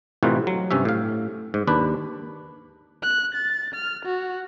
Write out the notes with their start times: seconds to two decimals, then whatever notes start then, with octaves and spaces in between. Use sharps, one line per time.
0.23 A2 C3 E3 D#4 F4 F#4
0.47 F#3
0.71 G2 C3 C#4 E5
0.85 A2 F5
1.54 G#2
1.67 D#2 D4 B4
3.03 F#6
3.35 A6
3.74 F6
4.05 F#4